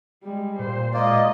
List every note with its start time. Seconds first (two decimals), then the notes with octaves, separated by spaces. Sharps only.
0.23 G3 G#3
0.59 A#2 C5
0.94 G#3 A#3 F4 D5 D#5